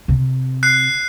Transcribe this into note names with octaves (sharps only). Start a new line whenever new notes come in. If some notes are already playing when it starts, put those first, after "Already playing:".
C3
F#6 C7